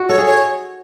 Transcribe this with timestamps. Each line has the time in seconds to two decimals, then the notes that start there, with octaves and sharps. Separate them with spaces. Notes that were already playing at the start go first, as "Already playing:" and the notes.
Already playing: F#4
0.09 A4 C#5
0.18 G#4
0.26 C#5